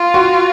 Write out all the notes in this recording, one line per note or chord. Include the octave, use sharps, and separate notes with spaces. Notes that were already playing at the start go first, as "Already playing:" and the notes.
Already playing: F4
F#4